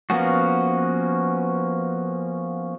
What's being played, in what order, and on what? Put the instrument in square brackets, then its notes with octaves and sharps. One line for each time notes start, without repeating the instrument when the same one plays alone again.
[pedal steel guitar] F3 A#3 B3 C#4 F#4